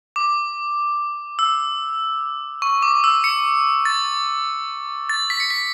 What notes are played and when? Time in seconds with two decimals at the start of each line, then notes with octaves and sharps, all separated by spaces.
0.16 D6
1.39 E6
2.62 C#6
2.83 D6
3.04 E6
3.24 C#7
3.85 A6
5.09 A6
5.30 B6
5.40 C#7
5.50 B6